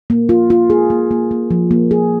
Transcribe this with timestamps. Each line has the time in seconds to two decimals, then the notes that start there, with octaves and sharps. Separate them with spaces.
0.10 A#3
0.29 F4
0.50 F4
0.70 G#4
0.90 A#3
1.11 A#3
1.31 A#3
1.51 F3
1.71 A#3
1.91 G#4